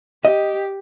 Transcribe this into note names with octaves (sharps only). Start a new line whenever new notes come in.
G4 D#5